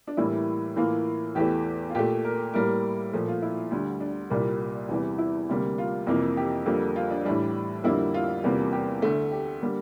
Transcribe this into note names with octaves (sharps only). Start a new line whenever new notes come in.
D4
A2 E3 G3 A#3 E4
A2 E3 A#3 F4
E2 E3 A3 G4
F4
A#2 A3 G4
A#4
A2 G3 A#3 A#4
A#2 F3 A3
F4
E4
D2 D3 G3
D4
C2 A#2 G3 A#3
E2 C3 E3 G3
E4
D2 C3 G3 A#3
F4
F2 C3 E3 A#3
G4
F2 D3 G3 A#3 A4
F4
D4
A2 E3 G3 D4
F2 D3 G3 A#3 E4
F4
E2 C3 G3 A#3 F4
G4
D2 D3 A3
G4
D3 G3 A#3